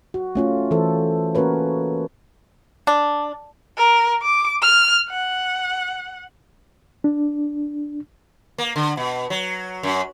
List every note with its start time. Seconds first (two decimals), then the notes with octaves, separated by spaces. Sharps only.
0.14 F#4
0.35 A3 C#4 F4
0.71 E3 A4 C5
1.35 A#3 C#4 F#4 A#4 B4 C#5
2.87 D4
3.77 A#4
4.22 D6
4.62 F6
5.10 F#5
7.04 D4
8.58 A#3
8.76 D3
8.97 B2
9.30 F#3
9.83 F#2